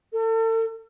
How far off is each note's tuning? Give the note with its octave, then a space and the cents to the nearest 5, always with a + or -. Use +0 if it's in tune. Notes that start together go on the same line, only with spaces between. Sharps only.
A4 +40